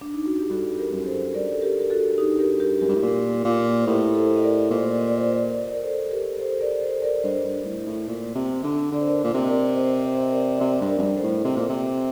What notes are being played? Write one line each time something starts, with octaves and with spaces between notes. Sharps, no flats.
D4
D#4
F#4
G4
G2 F#4 A4
G4 A#4
F#2
A4 C5
G2 A#4 D5
A4
G4 A#4
A#4
F#4 A4
D#4 G4
G4 A#4
G4 A#4
F#2 G4 A#4
G2
A2
A#2
A#2
C5
A2 G4 A#4
A4 C5
D#5
A#4 D5
A#2 C5 D#5
D#5
D5
C5 D#5
A#4 D5
D5
D#5
A#4 D5
A4 C5
G4 A#4
A4 C5
A#4 D5
A4 C5
A#4 D5
G2 C5 D#5
G2
A2
A2
A#2
C3
D3
D3 D5
C5
A#4 D5
A#2
C3
D#5
A#4 D5
C5 D#5
C5 D#5
D#5
A#4 D5
D5
C3 C5 D#5
G2
A#4 D5
F#2
G2
A4 C5
A2
C3 C5 D#5
A#2
C3